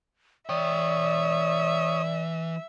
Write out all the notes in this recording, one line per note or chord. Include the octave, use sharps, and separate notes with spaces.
E3 C#5 D5 E5 G5 D#6